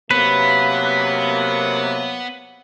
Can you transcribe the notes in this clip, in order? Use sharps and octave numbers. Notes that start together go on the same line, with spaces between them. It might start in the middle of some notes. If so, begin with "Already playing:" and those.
C3 F#3 A#3 B3 B4